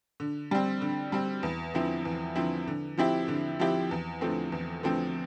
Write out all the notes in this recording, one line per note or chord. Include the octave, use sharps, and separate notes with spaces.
D3
G3 C4
D3
G3 C4
E2
D3 F3 C4 E4
E2
D3 F3 C4 E4
D3
F3 C4 E4 G4
D3
F3 C4 E4 G4
E2
D3 F3 A3 C4
E2
D3 F3 A3 C4